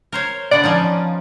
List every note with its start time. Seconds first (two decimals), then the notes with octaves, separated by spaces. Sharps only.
0.12 A#4 C5 C#5
0.51 D3 B3 D5 F#5
0.64 F3 C#4 D#4